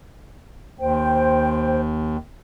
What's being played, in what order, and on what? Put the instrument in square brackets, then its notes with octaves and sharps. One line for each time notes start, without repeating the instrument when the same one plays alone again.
[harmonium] D#2 [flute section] C5 G5